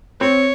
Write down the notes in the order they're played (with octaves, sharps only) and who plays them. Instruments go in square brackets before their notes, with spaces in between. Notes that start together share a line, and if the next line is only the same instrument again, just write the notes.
[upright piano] C4 [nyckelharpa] C#5